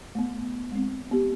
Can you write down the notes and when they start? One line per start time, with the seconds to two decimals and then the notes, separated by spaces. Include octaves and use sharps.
0.15 A3 B3
0.72 G#3 C4
1.11 B3 G4